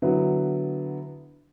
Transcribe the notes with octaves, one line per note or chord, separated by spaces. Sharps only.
D3 F#3 B3 E4